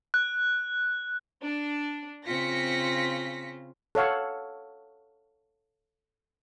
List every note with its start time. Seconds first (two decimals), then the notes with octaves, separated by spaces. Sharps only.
0.14 F#6
1.42 D4
2.26 C#3 C4 F4 A#6 B6 C#7
3.95 A4 C#5 F5 F#5